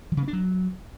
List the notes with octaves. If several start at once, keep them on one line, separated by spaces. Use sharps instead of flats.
F3
C#3
B3
D4
F#3